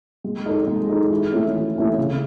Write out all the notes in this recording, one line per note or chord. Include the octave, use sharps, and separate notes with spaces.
G#3
D#4 A4
G#3
D#4 A4
E3
A3 C#4 E4
E3
A3 C#4 E4
C#3